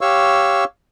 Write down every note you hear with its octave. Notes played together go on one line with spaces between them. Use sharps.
G4 C#5 F5 C#6 E6